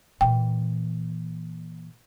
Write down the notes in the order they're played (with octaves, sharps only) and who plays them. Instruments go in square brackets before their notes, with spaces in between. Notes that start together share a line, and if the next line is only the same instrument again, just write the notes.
[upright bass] A#2 E3 [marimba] G5